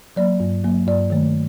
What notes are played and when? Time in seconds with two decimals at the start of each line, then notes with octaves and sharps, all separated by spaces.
0.16 F#3 A#3 D5
0.40 G2
0.64 F#3 A#3
0.87 G2 D5
1.10 D#3 A3